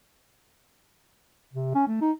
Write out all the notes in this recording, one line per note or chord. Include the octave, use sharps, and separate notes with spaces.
C3
C#4
A3
D#4